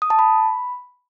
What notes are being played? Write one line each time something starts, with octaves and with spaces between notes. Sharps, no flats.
D#6
A5
B5